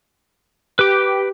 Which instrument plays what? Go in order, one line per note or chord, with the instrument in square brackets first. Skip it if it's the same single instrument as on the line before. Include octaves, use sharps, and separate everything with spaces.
[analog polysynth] G4 [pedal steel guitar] B4 D6